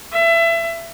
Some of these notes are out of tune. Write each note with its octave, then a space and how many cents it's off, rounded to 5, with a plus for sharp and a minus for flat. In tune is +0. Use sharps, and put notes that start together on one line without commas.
E5 +25